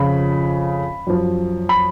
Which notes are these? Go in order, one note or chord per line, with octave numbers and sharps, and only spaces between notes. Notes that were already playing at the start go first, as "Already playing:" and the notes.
Already playing: F2 C#3 F3 B5
F#2 F3
B5